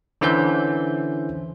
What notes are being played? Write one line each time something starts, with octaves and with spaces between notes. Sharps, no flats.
D3 E3 C#4 C5 E5 G6